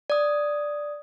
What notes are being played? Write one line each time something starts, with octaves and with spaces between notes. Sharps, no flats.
D5 D#6